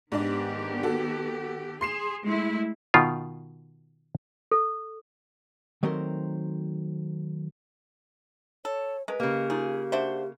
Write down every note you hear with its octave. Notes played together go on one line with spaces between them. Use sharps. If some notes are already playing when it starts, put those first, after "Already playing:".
G#2 D#3 B3 D4 G4 D5
F#4 A4
G#4 C6 C7 E7
G#3 A3 E4
B2 D#3 F4
A4
D#3 F#3 A3 C4 A#4 C5
A4 C#5
G#3 A#4 B4
C#3 A#3 G4
D#4 F4 G#4
D4 F#4 C5 E5